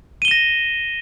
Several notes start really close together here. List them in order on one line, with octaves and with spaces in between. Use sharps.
D#7 G7 E7 A#6